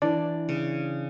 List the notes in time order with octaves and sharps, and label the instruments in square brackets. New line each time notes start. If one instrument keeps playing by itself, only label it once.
[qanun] E3 [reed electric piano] D4 D5
[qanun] C#3